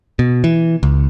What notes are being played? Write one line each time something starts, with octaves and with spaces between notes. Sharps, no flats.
B2
E3
C#2